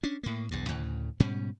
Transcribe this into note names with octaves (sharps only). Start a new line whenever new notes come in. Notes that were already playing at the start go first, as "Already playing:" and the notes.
C#4 D4
A2 A#3
B1 E2 G2
D2 A2 C#3
G#2 B2 G3 C#4